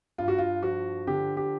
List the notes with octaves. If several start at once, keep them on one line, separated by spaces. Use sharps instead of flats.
G2 F4
F#4
F4
F3 F#4
D3 G4
G4